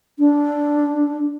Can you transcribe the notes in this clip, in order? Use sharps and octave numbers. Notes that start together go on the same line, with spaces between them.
D4